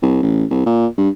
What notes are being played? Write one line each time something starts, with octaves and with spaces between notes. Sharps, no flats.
C2
A1
C2
A#2
G2